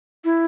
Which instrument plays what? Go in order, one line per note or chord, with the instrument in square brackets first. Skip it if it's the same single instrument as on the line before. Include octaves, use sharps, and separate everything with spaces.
[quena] E4